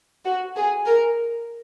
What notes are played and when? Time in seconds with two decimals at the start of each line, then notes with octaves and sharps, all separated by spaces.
0.24 F#4
0.55 G#4
0.86 A#4